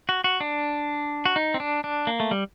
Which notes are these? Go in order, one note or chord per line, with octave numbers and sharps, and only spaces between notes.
F#4
F#4
D4
F#4
D#4
C4
D4
D4
A#3
A3
G3